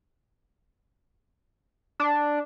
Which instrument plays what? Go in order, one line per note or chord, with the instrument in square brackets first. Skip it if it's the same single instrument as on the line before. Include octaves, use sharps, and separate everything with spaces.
[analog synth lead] D4